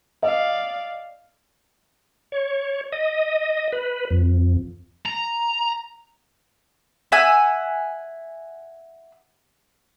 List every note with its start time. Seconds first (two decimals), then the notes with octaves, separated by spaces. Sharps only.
0.23 D5 D#5 F5
2.32 C#5
2.92 D#5
3.72 B4
4.11 F2
5.05 A#5
7.12 E5 F#5 G#5 E6